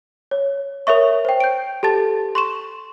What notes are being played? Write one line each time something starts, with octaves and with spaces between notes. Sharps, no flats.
C#5
A#4 C#5 E5 C#6
C5 G5
G6 D7
G4 A4 A5 A6
C6 C#6 E7